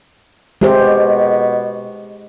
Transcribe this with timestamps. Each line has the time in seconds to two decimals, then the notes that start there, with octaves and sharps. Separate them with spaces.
0.61 C3 G#3 G4 C5
0.81 B2